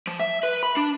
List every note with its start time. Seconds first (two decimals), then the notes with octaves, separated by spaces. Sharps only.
0.07 F3
0.20 E5
0.43 B4
0.63 B5
0.77 D4